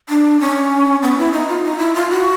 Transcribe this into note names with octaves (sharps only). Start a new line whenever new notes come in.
D4
C#4
B3
E4
D#4
F4
D#4
E4
F4
F#4